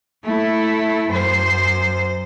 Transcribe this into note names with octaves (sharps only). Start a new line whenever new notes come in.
A3 E4
F#2 C5